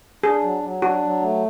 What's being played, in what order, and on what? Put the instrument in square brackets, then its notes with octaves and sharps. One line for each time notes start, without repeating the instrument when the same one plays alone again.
[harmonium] D4 [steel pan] G#4
[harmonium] F#3
F#3
[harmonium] D4 [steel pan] F#4
[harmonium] F#3
A3